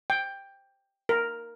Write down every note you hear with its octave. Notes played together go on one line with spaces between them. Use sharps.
G5
A#4